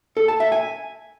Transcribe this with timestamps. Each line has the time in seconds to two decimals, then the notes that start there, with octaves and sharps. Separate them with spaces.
0.17 A4
0.28 A5
0.40 E5
0.52 G#5